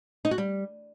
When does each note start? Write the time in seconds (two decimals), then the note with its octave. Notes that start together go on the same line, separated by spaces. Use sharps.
0.25 D#4
0.31 F#4
0.38 G3